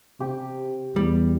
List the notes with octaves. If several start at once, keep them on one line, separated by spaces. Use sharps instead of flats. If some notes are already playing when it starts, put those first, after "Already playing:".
C3 G4
E2 G3